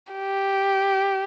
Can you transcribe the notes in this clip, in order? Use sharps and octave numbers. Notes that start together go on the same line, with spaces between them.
G4